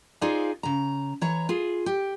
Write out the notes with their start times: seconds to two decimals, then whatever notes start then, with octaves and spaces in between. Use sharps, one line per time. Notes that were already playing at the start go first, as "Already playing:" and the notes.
0.21 D#4 F4 G#4 C5 D5 F5
0.63 C#3 A#5
1.21 E3 C#5 A#5
1.49 F4 G#4
1.86 G4